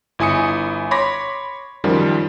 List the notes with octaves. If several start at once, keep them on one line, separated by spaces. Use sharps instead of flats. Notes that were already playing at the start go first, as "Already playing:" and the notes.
G1 E4 G#5 D#6 C#7
C#5 B5 C6 D6 A#6 B6
F#2 D#3 F3 G3